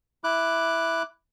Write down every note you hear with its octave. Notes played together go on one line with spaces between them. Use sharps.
E4 D6 F#6